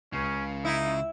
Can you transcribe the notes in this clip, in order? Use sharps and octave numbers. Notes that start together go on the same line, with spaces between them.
C#2 C#3 C#4
D#4 E4